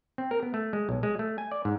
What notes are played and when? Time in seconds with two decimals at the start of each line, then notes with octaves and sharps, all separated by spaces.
0.18 C4
0.31 A#4
0.43 B3
0.54 A3
0.73 G#3
0.89 B1
1.03 G#3
1.19 A3
1.38 G#5
1.51 D5
1.65 G#2